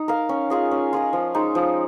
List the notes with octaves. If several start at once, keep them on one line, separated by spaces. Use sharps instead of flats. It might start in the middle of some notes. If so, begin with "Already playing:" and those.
Already playing: D#4
A#4 F5
C#4
F4 G#4 D#5
C#4
F4 G#4 D#5
F3
G#3 D#4
F3